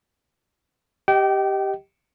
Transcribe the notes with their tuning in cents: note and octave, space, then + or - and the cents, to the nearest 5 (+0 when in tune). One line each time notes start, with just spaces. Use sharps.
G4 +0 D#5 +5 G5 -30